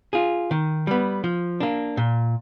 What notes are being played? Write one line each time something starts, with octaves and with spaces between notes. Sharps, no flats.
F4 G#4
D#3
G3 B3
F3
A#3 D4
A#2